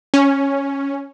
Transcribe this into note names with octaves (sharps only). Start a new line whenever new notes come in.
C#4